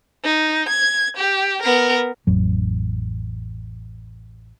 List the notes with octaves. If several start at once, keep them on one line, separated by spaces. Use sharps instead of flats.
D#4
G#6
G4
B3 A#4
A1 F2 F#3